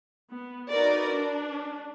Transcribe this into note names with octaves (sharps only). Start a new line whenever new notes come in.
B3
D#4 F#4 A#4 B4 D5
D4